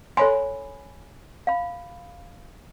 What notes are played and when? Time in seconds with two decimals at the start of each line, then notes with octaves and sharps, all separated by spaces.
0.17 A4 C#5 G#5 B5 C6
1.47 F5 B5